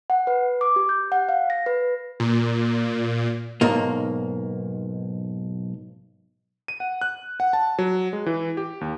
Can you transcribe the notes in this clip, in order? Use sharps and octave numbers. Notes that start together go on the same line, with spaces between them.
F#5
B4
D6
G4
G6
F#5
F5
A#6
B4
A#2
B1 G#2 A#3
D#7
F#5
F#6
F#5
A5
F#3
G#3
E3
G4
D#2